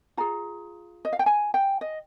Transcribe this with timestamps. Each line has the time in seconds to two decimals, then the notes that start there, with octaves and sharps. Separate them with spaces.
0.17 F4 G#4 A#5
1.05 D#5
1.13 F5
1.19 G5
1.26 G#5
1.54 G5
1.81 D#5